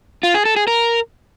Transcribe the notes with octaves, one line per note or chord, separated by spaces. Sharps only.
F4
G#4
A4
G#4
A#4